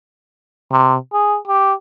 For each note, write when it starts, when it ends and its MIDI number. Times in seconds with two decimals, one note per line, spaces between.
0.72 0.97 48
1.13 1.37 68
1.48 1.73 67